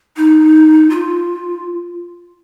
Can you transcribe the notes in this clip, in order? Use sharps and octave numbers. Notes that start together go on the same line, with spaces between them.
D#4
F4